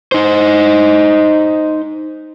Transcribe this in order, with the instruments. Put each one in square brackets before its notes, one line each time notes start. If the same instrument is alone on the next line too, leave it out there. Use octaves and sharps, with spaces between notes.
[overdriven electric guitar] D#4 C5